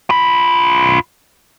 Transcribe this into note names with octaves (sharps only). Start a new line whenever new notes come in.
F4 B5